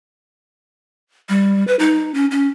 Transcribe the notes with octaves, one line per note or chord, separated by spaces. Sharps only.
G3
B4
D#4
C#4
C#4